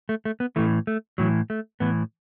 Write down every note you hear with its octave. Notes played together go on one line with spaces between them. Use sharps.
A3
A3
B3
A2 E3 A3
A3
A2 E3 F#3
A3
A2 E3 B3